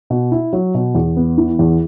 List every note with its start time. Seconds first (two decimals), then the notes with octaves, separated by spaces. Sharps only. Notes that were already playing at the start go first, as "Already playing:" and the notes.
0.10 B2
0.32 E4
0.53 F#3
0.74 B2
0.95 E2
1.17 B3
1.38 E3
1.59 E2